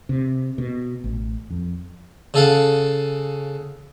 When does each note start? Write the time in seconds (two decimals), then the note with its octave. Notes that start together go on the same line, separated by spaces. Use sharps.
0.09 C3
0.58 B2
1.04 A1
1.50 F2
2.34 C#3 A4 F5 F#5